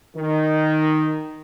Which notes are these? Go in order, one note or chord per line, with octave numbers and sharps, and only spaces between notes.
D#3